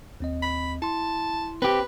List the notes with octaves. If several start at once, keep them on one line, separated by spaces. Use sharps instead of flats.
D#2 C4 D#5
B5
E4 A5 C6
C4 G4 B4